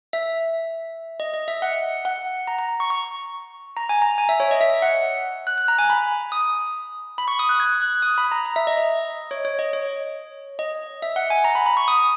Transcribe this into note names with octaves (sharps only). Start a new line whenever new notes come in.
E5
D#5
D#5
E5
F#5
F#5
A#5
A#5
C#6
C#6
A#5
G#5
A#5
G#5
E5
C#5
D#5
E5
F#5
F#6
F#6
A#5
G#5
B5
D#6
B5
C#6
D#6
F#6
G#6
F#6
D#6
B5
A#5
A#5
E5
D#5
D#5
C#5
C#5
D#5
C#5
D#5
E5
F#5
G#5
A#5
B5
B5
C#6
D#6